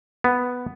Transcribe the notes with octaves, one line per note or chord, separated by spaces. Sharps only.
B3